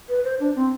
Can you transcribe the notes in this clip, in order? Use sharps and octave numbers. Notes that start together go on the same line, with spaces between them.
B4
C5
D4
C4